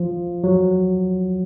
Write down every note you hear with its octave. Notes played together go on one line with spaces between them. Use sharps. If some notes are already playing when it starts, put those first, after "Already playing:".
Already playing: F3
F#3